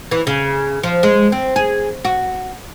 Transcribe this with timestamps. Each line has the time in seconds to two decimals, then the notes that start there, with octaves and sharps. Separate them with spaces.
0.11 E3
0.27 C#3
0.83 F3
1.03 G#3
1.32 C4
1.56 G#4
2.05 F#4